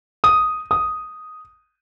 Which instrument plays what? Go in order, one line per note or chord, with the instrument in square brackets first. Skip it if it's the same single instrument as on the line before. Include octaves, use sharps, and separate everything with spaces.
[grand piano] D#6
D#6